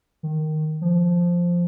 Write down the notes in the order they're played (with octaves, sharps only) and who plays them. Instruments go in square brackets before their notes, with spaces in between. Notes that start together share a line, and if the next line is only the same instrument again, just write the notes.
[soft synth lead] D#3
F3